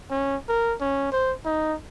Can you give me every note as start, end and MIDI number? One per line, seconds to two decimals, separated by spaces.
0.11 0.36 61
0.49 0.75 70
0.81 1.09 61
1.12 1.33 72
1.45 1.75 63